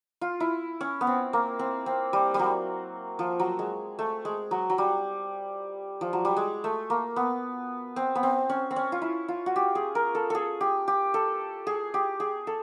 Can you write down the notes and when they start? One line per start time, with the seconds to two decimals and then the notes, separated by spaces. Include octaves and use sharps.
0.21 F4
0.40 E4
0.81 C#4
1.01 B3
1.07 C4
1.33 A#3
1.59 C4
1.86 C4
2.13 G3
2.34 G3
2.39 F#3
3.19 F3
3.40 F#3
3.59 G#3
3.99 A3
4.25 G#3
4.51 F#3
4.70 F#3
4.78 G3
6.01 F3
6.13 F#3
6.25 G3
6.37 G#3
6.64 A3
6.90 A#3
7.16 B3
7.96 C4
8.15 B3
8.23 C4
8.50 C#4
8.71 C4
8.76 C#4
8.92 F4
9.02 E4
9.28 F4
9.46 F#4
9.56 G4
9.75 G#4
9.95 A#4
10.15 A4
10.30 G#4 A4
10.61 G4
10.88 G4
11.14 A4
11.67 G#4
11.94 G4
12.20 G#4
12.47 A4